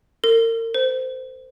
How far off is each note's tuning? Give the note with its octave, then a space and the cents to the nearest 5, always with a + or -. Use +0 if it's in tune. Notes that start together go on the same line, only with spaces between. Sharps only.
A#4 -35
C5 -20